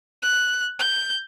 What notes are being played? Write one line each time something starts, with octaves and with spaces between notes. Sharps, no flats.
F#6
G6